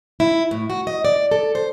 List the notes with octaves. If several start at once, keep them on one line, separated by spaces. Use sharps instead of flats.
E4
A2
F#4
D#5
D5
A4
C5